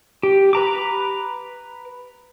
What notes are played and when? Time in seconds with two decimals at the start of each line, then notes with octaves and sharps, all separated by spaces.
0.23 G4
0.53 B4 A#5 D6